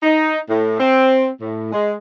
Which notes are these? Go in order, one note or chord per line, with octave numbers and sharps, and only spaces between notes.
D#4
A2
C4
A2
G#3